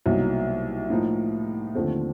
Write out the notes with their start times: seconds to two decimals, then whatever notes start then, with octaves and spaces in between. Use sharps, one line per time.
0.06 C2 B2 F#3 A#3 D#4
0.90 A2 F3 A#3 D#4
1.75 D#2 D3 F3 A3 C4